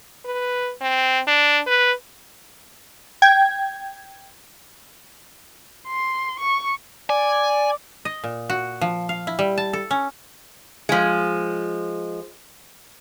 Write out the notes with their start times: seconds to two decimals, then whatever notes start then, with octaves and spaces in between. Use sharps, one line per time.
0.25 B4
0.81 C4
1.27 D4
1.67 B4
3.22 G5 G#6
5.88 C6
6.40 C#6
7.10 D5 G#5
8.05 D#5
8.24 A#2
8.50 F#4
8.81 F3
9.09 F5
9.27 E4
9.39 G3
9.58 A5
9.73 A4
9.91 C#4
10.89 F3 G#3